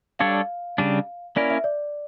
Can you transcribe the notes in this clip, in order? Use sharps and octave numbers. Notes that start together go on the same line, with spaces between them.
G3 D4 A4 C#5 F5
C#3 G3 D4
A#3 C#4 E4 A#4 D5
E5
D5